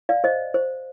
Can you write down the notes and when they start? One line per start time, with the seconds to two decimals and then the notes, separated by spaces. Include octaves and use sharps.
0.09 D5 F5
0.24 C5 D#5
0.54 C5